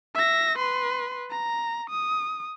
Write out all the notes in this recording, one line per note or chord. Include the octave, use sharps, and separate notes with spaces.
E5 A#6
B4 C6
A#5
D#6